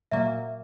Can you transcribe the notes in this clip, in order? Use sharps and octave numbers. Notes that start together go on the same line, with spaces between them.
A#2 F#3 A#3 E5